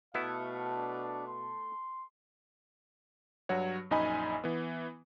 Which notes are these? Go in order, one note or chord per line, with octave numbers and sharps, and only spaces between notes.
B2 A3 B3 E4 F5
D4
C6
G2 F#3 F#4 C#5
A#1 F#2 D#4 D#5 G#5 B5
E3 B3